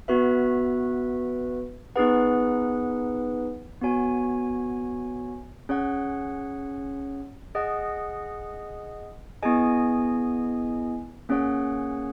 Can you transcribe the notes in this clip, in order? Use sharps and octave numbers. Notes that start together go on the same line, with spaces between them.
B3 F#4 B4 E5
B3 D#4 G#4 B4 F#5
B3 F#4 C#5 G#5
C#4 G#4 C#5 F#5
G#4 D#5 F#5
B3 E4 G#4 D#5 G#5
A#3 C#4 G#4 C#5 F#5